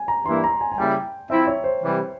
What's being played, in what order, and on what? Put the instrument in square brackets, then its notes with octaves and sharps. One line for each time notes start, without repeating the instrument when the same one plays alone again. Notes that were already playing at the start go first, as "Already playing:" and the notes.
Already playing: [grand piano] G#5
A#5
[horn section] G2 E3 A#3 E4 [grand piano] C6
[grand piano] A#5
G#5
G#5
[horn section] C#3 G3 A#3 E4 [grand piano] G5
[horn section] F3 C4 E4 [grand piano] E5
[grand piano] C#5
C5
[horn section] C3 E3 G3